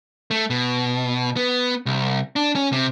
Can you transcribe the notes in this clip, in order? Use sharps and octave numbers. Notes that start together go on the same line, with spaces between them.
A3
B2
B3
C2
D4
C#4
C3